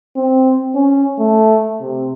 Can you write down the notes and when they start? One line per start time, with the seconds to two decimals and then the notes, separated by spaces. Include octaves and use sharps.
0.16 C4
0.75 C#4
1.19 A3
1.81 C3